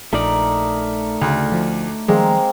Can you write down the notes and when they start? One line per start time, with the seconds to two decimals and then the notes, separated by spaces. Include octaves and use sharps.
0.13 A#1 A3 D#4 A#4 D5 D#6
1.21 D2 C#3
1.52 F3
2.08 D#3 F3 G3 G#3 A#3 C4